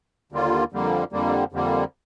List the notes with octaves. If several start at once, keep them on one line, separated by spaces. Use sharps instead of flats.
D#2 D3 G3 A#3 F4
F2 D3 G3 A#3
F2 D3 G3 A#3
F2 D3 G3 A#3